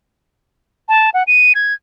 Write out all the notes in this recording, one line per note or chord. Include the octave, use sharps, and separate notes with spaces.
A5
F#5
D#7
G#6